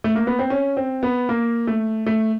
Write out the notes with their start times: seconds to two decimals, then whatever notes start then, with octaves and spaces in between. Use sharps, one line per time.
0.04 A3
0.15 A#3
0.27 B3
0.39 C4
0.50 C#4
0.77 C4
1.03 B3
1.29 A#3
1.67 A3
2.07 A3